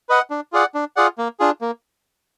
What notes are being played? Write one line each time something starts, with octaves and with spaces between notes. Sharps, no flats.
B4 D#5 F#5
D4
F4 G#4 D5 F#5
D4
F4 G#4 D5 F#5
A#3
D4 F4 G#4
A#3